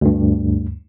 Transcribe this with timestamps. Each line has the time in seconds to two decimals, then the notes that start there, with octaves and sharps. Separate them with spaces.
0.01 D2 G2